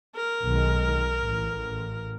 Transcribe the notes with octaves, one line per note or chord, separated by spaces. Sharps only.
A#4
B1 D#3 G#3
A1